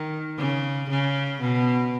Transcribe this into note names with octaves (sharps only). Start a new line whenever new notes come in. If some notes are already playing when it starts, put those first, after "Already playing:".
Already playing: D#3
C#3
C#3
B2